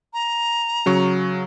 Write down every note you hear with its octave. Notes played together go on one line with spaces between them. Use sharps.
A#5
C#3 F#3 C#6